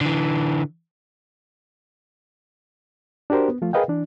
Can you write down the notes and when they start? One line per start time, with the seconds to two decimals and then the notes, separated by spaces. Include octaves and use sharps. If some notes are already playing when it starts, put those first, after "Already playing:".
0.01 D3 E3
3.30 D4 F#4 G4 A#4 C5
3.49 B3
3.62 F3 A3 F4
3.73 G#4 A#4 B4 D#5 F5 G5
3.88 E3 D4